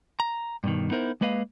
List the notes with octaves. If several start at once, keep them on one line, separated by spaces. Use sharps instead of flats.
A#5
G2 B2 D#3
B3 D#4 E4 A#4 C5
G#3 A#3 B4 D#5 F5